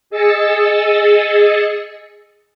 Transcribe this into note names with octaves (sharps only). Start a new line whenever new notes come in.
G#4 D#5 E6 A6 C#7